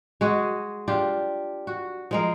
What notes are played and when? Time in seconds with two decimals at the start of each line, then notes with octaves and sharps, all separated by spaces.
0.21 G#3 F#4 G#4
0.88 D4 F4 G4
1.67 F#4
2.11 F3 G#3 A#4